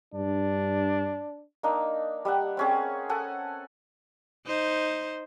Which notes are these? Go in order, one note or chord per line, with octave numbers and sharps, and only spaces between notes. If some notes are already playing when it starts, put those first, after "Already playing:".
G2 D4
A#3 D4 D#4
G3 E5 F#5
C4 C#4 G#4
A4 F#5 G#5
D#4 C5